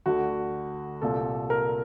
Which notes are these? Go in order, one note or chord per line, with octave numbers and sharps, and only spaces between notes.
D2 D3 F#4
C2 A#2 A4
A#4